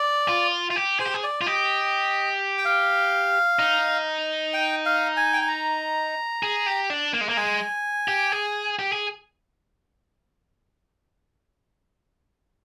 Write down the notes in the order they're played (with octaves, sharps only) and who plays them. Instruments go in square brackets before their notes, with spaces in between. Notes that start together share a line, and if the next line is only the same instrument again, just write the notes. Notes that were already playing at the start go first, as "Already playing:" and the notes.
Already playing: [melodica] D5
[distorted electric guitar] F4
F4
G4
[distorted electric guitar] G#4 [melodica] C5
[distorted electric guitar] G4
G#4
[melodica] D5
[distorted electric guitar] F4
[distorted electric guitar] G4 [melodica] D#5
[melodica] G5
F5
[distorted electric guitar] D#4
[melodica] G5
F5
G#5
G5
G#5
A#5
[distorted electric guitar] G#4
G4
D4
A#3
G#3
[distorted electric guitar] A#3 [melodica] A#5
[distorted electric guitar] G#3 [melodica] G#5
[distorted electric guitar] G4
G#4
G4
G#4